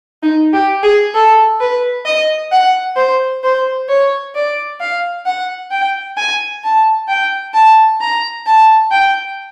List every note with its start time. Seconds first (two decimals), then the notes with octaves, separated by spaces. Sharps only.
0.23 D#4
0.53 G4
0.83 G#4
1.15 A4
1.61 B4
2.05 D#5
2.52 F#5
2.97 C5
3.44 C5
3.89 C#5
4.35 D5
4.80 F5
5.26 F#5
5.71 G5
6.17 G#5
6.64 A5
7.08 G5
7.54 A5
8.01 A#5
8.47 A5
8.91 G5